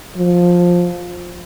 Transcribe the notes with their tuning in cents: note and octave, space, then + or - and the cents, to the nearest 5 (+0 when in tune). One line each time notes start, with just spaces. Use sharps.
F3 +10